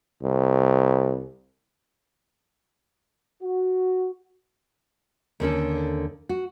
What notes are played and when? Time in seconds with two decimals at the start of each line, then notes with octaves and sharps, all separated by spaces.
0.22 C2
3.42 F#4
5.40 D#2 D3 C#4 A4
6.29 F#4